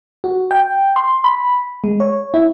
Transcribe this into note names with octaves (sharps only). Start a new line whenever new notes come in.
F#4
G5
C6
B5
G#3
C#5
E4